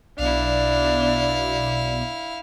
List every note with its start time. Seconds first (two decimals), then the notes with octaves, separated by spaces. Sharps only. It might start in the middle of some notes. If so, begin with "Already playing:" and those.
0.19 B1 B2 D4 E4 D5 F5